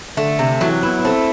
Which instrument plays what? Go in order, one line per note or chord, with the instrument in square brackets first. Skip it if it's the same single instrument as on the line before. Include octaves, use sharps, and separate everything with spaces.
[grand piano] D3 [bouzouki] A3
[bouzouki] C3
[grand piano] E3 [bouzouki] F#3
[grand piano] B3 [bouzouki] E4
[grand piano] B3
[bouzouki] A3 [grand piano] C4